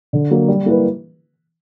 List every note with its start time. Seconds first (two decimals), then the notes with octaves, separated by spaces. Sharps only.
0.13 D3
0.31 F#3 A#3
0.48 G3
0.66 A#3 E4 B4